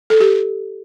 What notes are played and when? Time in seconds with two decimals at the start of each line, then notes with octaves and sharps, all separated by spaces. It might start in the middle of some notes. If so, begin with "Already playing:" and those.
0.10 A4
0.20 G4